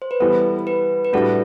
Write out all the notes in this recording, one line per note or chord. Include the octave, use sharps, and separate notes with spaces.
C5
B4
E3 G3 B3 A4
B4
B4
A2 G3 D4 F#4 A4